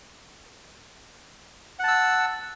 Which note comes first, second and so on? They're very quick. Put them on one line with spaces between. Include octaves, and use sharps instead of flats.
F#5 A5 E6